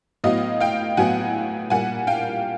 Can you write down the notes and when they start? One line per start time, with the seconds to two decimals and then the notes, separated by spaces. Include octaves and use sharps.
0.24 A2 F#3 B3 D#5 F5
0.60 F5 G5
0.97 A2 F#3 B3 F#5 G#5
1.70 A#2 G3 A#3 F#5 G#5
2.07 F5 G5